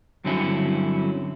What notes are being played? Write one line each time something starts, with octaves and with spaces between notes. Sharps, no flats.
G2 D3 F#3 C4 C#4 E4